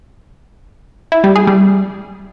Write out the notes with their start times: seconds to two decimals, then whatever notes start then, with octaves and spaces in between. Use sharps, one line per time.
1.12 E4
1.24 G3
1.36 G#4
1.47 G3